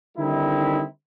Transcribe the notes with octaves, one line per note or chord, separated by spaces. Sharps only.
D3 D#3 G3 C4 D#4 E4